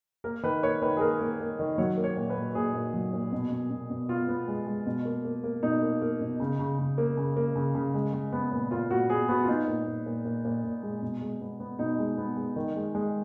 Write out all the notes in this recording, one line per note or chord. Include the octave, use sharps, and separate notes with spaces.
A#3 A#4
D#3 B4
A#3 C#5
D#3 B4
G#4
A#3 A#4
A#3
A#3
D#3
F#3 C#5
A#3
C#5
A#2
B4
A#2
A#2 G#4
A#2
F#3
A#2
B2
B2
B2
B2
B3 F4
B3
G#3
G#3
B2
A#3
A#3
A#3
B2 D#4
A#3
A#3
B2
C#3
C#3
C#3
A#3
C#3
A#3
C#3
C#3
G#3
G#3
B3
A#2
A#2 F4
A#2 F#4
B3 G#4
B3 F#4
F4
B3 D#4
A#2
A#2
A#2
A#2
A#2
A#2
G#3
B2
G#3
B3
B3
B2 D#4
G#3
B3
G#3
D#3
G#3
G#3